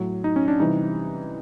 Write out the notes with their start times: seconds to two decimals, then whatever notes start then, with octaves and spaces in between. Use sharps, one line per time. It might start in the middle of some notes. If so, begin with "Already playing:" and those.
Already playing: A2 F#3
0.24 D#4
0.36 C#4
0.48 D4
0.60 C3 E3 G3 D#4